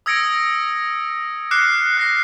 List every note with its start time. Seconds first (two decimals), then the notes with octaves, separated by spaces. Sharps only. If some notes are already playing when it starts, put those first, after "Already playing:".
0.06 D#6 E6 G#6 A#6 C#7 D7
1.51 D6 F6 F#6 C7 C#7
1.97 F#6 A#6 C7